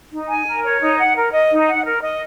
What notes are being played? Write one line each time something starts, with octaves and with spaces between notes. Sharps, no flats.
D#4
G#5
A#4
C#5
D#4
F#5
A#4
D#5
D#4
F#5
A#4
D#5